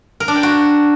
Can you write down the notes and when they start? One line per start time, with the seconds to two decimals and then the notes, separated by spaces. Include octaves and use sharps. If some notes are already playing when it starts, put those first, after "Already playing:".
0.20 A#4
0.28 D4
0.36 G5
0.43 F#4